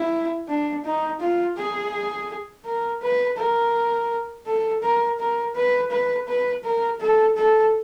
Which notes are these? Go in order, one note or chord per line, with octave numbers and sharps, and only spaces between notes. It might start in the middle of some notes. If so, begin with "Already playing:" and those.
Already playing: E4
D4
D#4
F4
G#4
A#4
B4
A#4
A4
A#4
A#4
B4
B4
B4
A#4
A4
A4